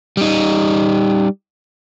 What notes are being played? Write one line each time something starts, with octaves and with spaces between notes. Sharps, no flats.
G3 D#4